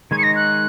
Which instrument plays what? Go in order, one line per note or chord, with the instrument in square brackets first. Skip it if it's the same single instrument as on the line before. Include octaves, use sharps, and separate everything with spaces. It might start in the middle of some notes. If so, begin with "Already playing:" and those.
[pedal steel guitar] D#3 G#3 D#4 G#4 C#5 [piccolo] G#6
[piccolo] C#7
A#6
F#6